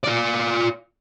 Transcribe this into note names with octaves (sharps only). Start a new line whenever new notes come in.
F4 D5